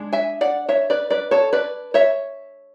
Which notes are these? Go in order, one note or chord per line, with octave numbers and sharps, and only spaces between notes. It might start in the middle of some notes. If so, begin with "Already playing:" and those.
Already playing: G#3 D4
E5 G#5
D5 F#5
C#5 E5
B4 D5
B4 D5
A4 C#5
B4 D5
C#5 E5